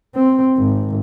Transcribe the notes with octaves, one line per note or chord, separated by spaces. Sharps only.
C4
G#1